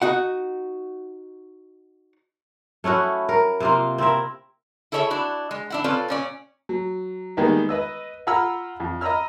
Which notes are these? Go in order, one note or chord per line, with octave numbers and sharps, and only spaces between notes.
D#4 F#4 F#5
A3 C#4 E4 F#4
A#4
C3 A#3 F4
C4 E4 A#4 E5
E4 G#4 A4 C#5 D#5 E5
D4 E4 F#4
G#3
D4 E4 F#5
C4 C#4 F4 A4 B4 D5
A#2 C#4 D5
F#3
D#3 G3 G#3 A#3 B3 D#4
B4 D#5 E6
F4 F#5 A#5 B5 E6 F6
F2
D#5 A#5 B5 E6 F6